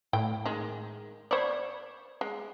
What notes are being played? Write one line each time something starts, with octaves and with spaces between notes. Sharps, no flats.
A2 G5
D#3 G#3
C5 D5 B5 C#6 G#6
G#3